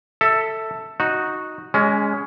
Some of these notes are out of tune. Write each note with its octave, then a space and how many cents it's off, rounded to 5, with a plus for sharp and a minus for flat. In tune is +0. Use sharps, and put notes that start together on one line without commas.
A4 +10 E5 -10
D#4 +0 F#4 -5
G#3 +0 C#4 +20